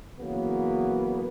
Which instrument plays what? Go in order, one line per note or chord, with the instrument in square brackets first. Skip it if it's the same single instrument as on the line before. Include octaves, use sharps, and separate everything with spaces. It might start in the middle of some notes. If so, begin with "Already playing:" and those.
[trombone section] C#3 E3 F#3 A#3 B3